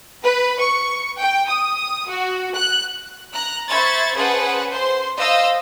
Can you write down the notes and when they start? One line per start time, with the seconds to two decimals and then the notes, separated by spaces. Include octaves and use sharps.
0.25 B4
0.61 C#6
1.20 G5
1.49 D#6
2.09 F#4
2.56 F#6
3.33 A#5 F#6
3.69 C5 E5 B5 C#6 G#6 A6
4.16 C#4 G#4 B4 C5 F#5 A5
4.70 C5 C6
5.17 C5 D#5 F5 E6